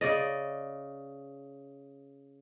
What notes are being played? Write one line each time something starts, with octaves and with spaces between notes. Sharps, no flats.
C#3 D5 D#5